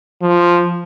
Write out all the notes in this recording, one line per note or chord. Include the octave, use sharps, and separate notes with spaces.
F3